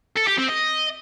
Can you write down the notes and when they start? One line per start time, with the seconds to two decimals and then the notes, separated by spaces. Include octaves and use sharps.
0.17 A4
0.28 G4
0.39 C4
0.49 D#5